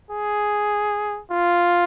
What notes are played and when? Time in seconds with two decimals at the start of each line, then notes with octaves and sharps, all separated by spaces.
0.10 G#4
1.31 F4